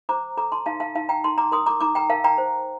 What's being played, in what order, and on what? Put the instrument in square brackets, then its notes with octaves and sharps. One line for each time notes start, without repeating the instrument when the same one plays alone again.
[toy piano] C5 A#5 D6
A4 A#5 D6
A5 C6
D#4 F5 A5
F5 A5
D#4 F5 A5
G5 A#5
D#4 A5 C6
A#5 D6
A#4 C6 D#6
A#5 D6
D#4 A#5 D6
G5 A#5
A#4 F5 A5
G5 A#5
C5